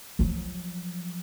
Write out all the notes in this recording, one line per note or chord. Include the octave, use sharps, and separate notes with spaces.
F3 F#3